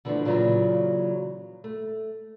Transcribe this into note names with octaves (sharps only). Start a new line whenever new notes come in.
D3 E3 F3 G#3 A3 D4
A#2 C#3 E3 F#3 F4
A3